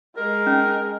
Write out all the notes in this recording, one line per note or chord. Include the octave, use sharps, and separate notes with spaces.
G#3 A#4
C#4